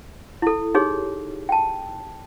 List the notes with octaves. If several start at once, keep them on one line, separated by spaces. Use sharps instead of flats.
E4 A4
D#4 G4 G#4 C#5
G5 A5